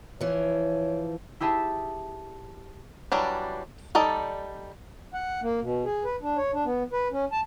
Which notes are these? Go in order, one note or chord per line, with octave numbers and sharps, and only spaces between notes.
E3 F3 C#5
E4 G4 G#4 E5 A5
E3 F#3 G3 D4
G3 D#4 A4 D5
F#5
A#3
B2
G#4
B4
D4
C#5
D4
B3
B4
C#4
A5